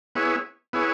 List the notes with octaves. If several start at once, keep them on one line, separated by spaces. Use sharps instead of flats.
B3 E4 G#4 C#5
B3 E4 G#4 C#5